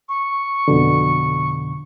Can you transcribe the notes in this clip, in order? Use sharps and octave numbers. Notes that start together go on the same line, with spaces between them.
C#6
F2 B2 D3